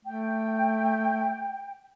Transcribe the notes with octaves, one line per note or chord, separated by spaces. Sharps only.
A3 G5